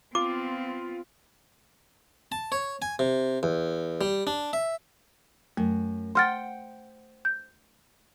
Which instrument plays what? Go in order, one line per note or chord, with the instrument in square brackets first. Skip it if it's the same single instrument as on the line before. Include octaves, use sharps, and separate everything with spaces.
[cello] B3 C4 [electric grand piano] F4 [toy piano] D6
[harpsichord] A5
C#5
G#5
C3
E2
G3
D4
E5
[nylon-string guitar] F#2 [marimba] A3
[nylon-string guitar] C5 F#5 G5 [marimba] C6 F6 A6
[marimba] G6